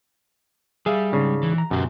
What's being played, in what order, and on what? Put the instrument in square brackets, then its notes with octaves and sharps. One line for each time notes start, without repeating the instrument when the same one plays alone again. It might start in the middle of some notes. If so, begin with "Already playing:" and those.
[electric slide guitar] G3 [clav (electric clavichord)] G#4 E5 F5
[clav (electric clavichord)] G#2 C#3 D4
[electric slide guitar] E3
[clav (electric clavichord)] A#5
[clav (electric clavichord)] F#2 [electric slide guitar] B2 G4